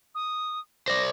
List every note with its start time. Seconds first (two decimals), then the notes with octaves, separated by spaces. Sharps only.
0.15 D#6
0.88 C5 D5 A#6